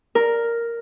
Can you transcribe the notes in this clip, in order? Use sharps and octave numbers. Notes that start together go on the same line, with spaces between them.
A#4